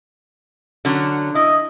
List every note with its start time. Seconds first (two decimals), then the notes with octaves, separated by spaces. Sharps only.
0.85 D3 F#3 C#4
1.35 E4 D#5